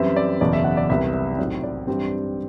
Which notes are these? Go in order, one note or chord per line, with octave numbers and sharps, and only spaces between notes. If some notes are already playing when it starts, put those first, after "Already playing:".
Already playing: F#2 E3 G3 C4 E5
D5
F#1 E2 B2 D5
E5
F#5
D5
C2 C3 G3 B3 E5
E5
B1 A2 F#3 C4 D5
D5
G2 E3 G3 C4